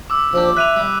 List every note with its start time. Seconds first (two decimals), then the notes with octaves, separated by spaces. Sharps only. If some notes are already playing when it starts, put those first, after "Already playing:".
0.10 D6 E6
0.33 A#1 D4 G4 C5
0.57 E5 B5 F#6 D#7 F7
0.77 G3